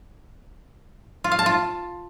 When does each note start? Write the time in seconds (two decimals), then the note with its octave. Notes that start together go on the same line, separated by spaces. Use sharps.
1.24 F4
1.32 F5
1.39 A5
1.46 F4